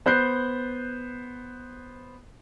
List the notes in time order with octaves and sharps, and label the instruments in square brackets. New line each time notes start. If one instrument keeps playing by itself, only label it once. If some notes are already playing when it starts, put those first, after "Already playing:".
[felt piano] B3 C5 F#6 G6 C7